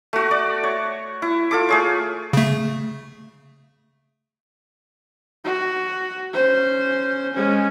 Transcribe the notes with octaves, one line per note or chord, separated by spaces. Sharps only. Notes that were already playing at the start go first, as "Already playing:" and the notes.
A3 F#4
D5
C#5
E4
F4 A4 D6
A3 G#4 C#5
C#3 A3
F#4
C#4 C5
G#3 C#4